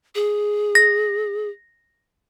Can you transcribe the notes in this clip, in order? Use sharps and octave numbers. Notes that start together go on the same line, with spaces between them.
G#4
A#6